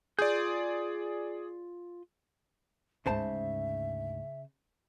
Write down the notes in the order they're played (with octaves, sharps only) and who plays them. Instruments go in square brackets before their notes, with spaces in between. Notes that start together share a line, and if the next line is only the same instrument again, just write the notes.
[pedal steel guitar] F4 G6 [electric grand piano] G#4 D5
[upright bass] D2 G#2 [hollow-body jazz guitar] C#3 C5 A5 [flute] E5